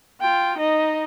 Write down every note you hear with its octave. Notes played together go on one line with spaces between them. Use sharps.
F4 G5
D#4 D#5